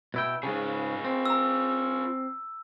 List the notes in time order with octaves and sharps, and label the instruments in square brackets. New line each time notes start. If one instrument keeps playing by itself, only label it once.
[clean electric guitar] B2 E4 G5
[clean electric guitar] G#2 C#3 [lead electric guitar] F4 G#4
[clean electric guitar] C4
[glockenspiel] A#5 E6